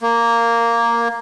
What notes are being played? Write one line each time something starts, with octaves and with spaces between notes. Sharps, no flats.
A#3